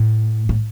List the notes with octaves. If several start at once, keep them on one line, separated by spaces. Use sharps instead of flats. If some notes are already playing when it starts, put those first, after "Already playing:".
Already playing: A2
A2